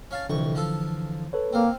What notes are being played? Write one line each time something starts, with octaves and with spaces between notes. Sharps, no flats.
C#4 F5 A5
C2 F2 D3 E3 C#6
F3 F4 A4
A4 B4 C#5
A#3 C4 F5